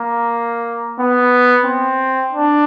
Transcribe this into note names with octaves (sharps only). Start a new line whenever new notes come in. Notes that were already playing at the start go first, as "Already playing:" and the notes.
Already playing: A#3
B3
C4
D4